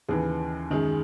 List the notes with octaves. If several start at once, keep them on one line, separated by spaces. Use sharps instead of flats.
D#2 C#3 E3 G#4
F#2 D#3 G#3